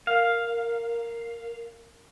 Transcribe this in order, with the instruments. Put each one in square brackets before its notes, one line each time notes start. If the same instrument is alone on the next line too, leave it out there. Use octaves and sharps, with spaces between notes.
[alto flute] A#4 [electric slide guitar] F5